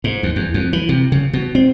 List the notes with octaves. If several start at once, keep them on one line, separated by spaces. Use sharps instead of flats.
G#2
D#2
E2
F2
E3
C3
C#3
B2
C4